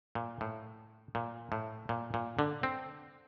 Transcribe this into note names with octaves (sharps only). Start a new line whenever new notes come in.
A#2
A2
A#2
A2
A#2
A#2
D3
C4